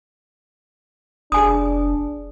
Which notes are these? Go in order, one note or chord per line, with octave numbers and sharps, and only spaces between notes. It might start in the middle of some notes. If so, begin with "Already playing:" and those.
F1 D4 G#4 G#5 D#6